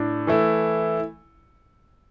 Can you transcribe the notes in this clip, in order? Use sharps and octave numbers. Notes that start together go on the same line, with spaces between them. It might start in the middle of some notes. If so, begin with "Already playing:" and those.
Already playing: A2 D4
E3 A3 E4